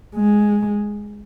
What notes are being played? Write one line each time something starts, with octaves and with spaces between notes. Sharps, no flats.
G#3